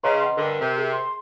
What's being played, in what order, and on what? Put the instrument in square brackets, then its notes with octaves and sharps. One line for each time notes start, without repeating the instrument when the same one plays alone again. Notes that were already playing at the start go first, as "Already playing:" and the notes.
[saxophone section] C#3 [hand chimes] B4 D#5 [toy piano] C5 A#5 C6
[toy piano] F#5 C6
[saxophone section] G2 D3 [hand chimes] A#4
[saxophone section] C3
[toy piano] G#4
[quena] C6